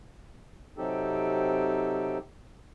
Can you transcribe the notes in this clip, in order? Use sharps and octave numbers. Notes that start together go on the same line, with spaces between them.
C3 F#3 C4 D#4 G4 A4